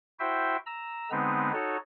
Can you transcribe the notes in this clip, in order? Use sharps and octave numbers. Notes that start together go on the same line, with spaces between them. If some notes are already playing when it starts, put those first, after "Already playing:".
E4 F#4 C5 E5 G5
A#5 E6
D3 G#3 B3 C4 D#4 B4
D#4 F#4 A4 C#5